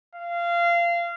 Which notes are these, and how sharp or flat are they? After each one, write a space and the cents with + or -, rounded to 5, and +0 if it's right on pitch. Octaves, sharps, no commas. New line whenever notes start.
F5 -20